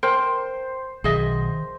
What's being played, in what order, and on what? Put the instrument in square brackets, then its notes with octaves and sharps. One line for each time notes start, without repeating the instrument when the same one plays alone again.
[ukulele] A#4 G5 [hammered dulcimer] C5
[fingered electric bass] B1 [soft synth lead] D#3 [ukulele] G#4 D#5 E5